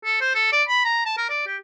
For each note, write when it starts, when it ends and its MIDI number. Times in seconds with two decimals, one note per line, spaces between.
0.05 0.18 69
0.21 0.33 72
0.35 0.48 69
0.53 0.63 74
0.68 0.80 83
0.85 1.06 82
1.06 1.17 81
1.18 1.28 70
1.30 1.45 74
1.47 1.57 67